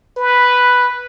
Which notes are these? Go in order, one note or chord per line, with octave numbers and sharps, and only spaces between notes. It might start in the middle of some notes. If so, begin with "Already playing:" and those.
B4